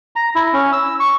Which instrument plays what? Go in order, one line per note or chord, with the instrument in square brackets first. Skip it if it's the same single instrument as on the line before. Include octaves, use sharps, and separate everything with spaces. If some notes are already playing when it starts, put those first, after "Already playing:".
[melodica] A#5
E4
C#4
E6
C#6